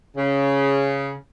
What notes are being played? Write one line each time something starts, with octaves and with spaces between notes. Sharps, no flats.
C#3